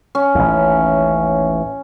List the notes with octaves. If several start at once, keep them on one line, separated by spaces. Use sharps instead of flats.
C#4
A1 D#2